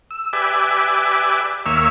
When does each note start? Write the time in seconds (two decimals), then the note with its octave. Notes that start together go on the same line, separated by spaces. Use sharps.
0.11 E6
0.33 G4 B4 D5 E5 G#5
1.66 D#2 A#3 C#5 E5 E6 F6